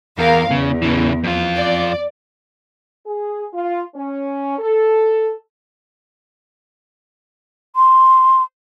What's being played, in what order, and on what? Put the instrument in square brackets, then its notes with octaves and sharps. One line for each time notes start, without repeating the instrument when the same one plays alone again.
[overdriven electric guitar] E2 [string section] A#4 F5
[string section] E2 [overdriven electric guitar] C#3
[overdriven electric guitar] C#3 E3
F2 F4
[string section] D5
[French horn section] G#4
F4
C#4
A4
[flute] C6